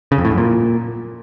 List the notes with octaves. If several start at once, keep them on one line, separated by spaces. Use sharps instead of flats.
C#3
F2
A2
F#2
A#2